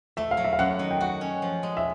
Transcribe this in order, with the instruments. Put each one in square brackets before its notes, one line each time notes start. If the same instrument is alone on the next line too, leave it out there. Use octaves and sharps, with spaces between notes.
[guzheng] A3 [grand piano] E5
[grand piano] F5
[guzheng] F#3
[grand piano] E5
F5
[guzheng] F#2 [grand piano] F#5
[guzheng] D#3
[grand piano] G5
[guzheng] F#4 [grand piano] F#5
[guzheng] C#4
F3
G#3
[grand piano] E5